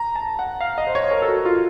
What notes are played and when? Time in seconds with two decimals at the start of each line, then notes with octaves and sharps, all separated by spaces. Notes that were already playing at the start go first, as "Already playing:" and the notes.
Already playing: A#5
0.15 A5
0.39 F#5
0.61 F5
0.78 D#5
0.87 C5
0.95 C#5
1.11 A#4
1.22 A4
1.28 F#4
1.45 F4